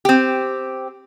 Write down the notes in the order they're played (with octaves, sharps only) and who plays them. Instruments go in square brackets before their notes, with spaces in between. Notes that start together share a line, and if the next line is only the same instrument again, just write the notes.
[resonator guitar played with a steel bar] C4 G4